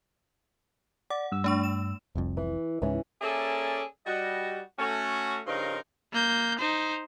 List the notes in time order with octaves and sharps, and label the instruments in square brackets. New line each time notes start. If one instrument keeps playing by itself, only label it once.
[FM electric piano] D5 [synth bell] F#5
[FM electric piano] G2 E6
[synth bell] A3 D4 C#6
E7
[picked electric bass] F1 C2 F2
[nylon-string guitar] E3
[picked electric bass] C#2 G#2 [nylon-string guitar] E3 C#4
[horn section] A#3 C#4 G#4 A4 D5 E5
G3 F#4 D#5
A3 C#4 F#4
G2 C#3 F3 D#4 A#4 C6
[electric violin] A#3 G6
D#4 C5